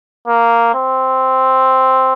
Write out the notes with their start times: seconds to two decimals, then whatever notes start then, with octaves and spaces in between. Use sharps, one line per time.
0.28 A#3
0.74 C4